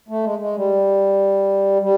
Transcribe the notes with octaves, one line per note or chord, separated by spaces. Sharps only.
A3
G#3
G#3
G3
G3